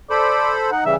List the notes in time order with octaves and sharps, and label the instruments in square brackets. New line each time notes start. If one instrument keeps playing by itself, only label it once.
[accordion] A4 C5 B5 [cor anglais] D5
[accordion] D#4 [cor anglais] F#5
[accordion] C#3 E3 G3 [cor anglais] E5